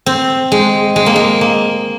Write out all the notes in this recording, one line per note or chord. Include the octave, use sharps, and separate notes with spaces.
C4
G#3
G#3
A#3
G#3
A#3